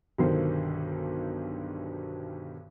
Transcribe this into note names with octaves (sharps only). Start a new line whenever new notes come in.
B1 G2 D3 D#3 C5